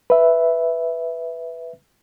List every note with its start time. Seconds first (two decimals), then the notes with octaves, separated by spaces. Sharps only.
0.10 B4 E5